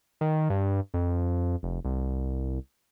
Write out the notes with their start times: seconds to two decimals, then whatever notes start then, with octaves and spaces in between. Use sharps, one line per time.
0.21 D#3
0.50 G2
0.94 F2
1.63 F1
1.85 C2